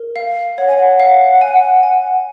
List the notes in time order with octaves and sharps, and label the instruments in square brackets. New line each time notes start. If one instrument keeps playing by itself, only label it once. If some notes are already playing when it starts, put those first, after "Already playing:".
Already playing: [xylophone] A#4
F5
[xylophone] C#5 [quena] F#5
[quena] G#5
F#5
[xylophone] F5
G#5
G#5